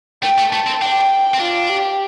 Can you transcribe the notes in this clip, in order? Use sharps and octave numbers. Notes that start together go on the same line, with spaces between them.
A3 G5
A3
A3 A5
C4
D4 G5
C4
D4 F4
G4